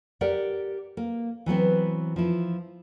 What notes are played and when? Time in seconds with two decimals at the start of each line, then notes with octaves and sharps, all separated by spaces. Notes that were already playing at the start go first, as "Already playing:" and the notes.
0.21 G4 A#4 D5 F#5
0.97 A#3
1.46 E3 F#3 B3 C4
2.16 F3 E4